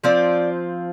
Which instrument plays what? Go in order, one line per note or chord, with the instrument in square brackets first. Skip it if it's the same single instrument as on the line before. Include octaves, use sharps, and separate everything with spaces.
[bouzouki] F3 C4 F4 D5